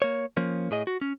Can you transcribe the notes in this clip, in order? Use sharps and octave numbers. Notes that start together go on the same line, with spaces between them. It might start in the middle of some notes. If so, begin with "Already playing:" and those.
A#3 C#5
F3 A#3 C#4
A2 G#4 D#5
F#4
C#4